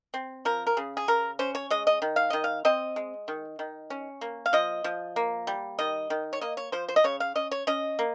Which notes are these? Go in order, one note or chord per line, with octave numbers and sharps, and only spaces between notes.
C4
F3 A#4
A#4
C#3 G#4
G#4
C#3 A#4
C#4 C5
C#5
G#3 D#5
D#5
D#3
F5
D#3 D#5
F5
C4 D#5
G#3
D#3
D#3
C#4
A#3
F5
F3 D#5
F3
A#3
G3
D#3 D#5
D#3
C#5
A#3 D#5
C#5
F3 C5
C5
D#5
C#3 C#5
F5
C#4 D#5
C#5
C#4 D#5
A#3